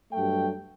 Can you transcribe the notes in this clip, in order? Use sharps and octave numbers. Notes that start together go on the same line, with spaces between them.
G2 F#3 A3 G5